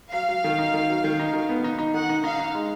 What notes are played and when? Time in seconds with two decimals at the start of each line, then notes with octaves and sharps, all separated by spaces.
0.13 F#3 F5
0.29 F#3
0.44 D#3
0.59 D#4
0.74 D#3
0.89 F#3
1.04 D#3
1.19 D#4
1.33 D#3
1.49 B3
1.64 D#4
1.79 D#4
1.94 D#3 F#5
2.09 D#4
2.24 D#4 F5
2.39 D#4
2.55 G#3